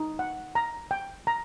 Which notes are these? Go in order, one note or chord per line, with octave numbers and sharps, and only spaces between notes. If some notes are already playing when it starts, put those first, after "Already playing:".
Already playing: D#4
F#5
A#5
G5
A#5